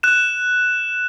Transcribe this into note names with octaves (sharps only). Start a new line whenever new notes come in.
F#6 E7